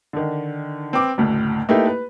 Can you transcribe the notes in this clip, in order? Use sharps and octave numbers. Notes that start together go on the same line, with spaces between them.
D3 D#3
C4 B4 D6
F#1 D2 A2
A3 A#3 D#4 E4 G4 B4
B4